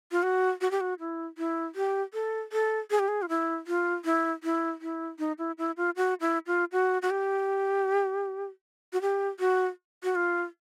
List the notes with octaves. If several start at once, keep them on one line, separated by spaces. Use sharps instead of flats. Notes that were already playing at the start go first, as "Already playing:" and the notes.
F4
F#4
F#4
G4
F#4
E4
E4
G4
A4
A4
G#4
G4
G#4
F4
E4
F4
E4
E4
E4
D#4
E4
E4
F4
F#4
E4
F4
F#4
F#4
G4
F#4
G4
F#4
F#4
F4